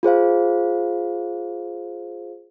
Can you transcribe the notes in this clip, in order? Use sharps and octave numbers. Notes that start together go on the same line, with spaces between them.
F4 G#4 C5 F5